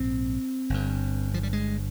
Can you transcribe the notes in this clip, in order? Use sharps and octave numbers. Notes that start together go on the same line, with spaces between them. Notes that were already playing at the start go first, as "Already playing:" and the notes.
Already playing: A#1 G#2 C4
G1 G2
F3
G3
G#3